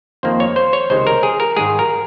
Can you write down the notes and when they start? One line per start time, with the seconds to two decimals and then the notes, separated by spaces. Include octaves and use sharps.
0.23 F2 D#3 A#3 C5
0.40 C#5
0.56 C5
0.73 C#5
0.90 C#2 C3 D#3 G#3 C5
1.07 A#4
1.23 G#4
1.40 A#4
1.57 G#2 D#3 G#3 G#4
1.79 A#4